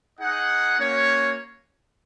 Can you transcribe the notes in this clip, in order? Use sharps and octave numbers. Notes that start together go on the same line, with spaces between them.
D#4 G#4 D#5 F#5
A#3 C#4 F#4 C#5